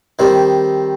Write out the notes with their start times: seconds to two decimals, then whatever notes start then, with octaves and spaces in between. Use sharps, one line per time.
0.19 D#3 G3 C4